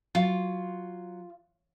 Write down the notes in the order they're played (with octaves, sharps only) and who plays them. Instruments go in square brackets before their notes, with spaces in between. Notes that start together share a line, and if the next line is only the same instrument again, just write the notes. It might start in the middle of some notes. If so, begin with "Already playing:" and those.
[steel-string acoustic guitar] F#3 [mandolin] F4